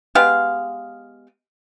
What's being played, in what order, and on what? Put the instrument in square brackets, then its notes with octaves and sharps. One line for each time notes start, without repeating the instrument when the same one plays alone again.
[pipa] G#3 B3 G4 F5